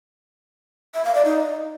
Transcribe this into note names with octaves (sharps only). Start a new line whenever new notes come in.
E5
F5
D5
D#4